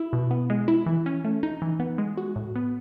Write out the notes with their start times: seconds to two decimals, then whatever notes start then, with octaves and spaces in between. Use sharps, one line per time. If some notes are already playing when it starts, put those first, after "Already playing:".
Already playing: E4
0.13 B2
0.31 B3
0.50 G#3
0.68 E4
0.86 E3
1.06 C#4
1.25 A3
1.43 D#4
1.62 E3
1.80 B3
1.98 G#3
2.17 F#4
2.36 A2
2.56 B3